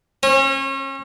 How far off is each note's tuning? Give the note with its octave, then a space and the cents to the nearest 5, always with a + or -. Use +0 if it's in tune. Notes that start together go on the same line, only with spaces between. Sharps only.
C#4 -35